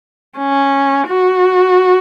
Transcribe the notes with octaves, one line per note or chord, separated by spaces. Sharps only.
C#4
F#4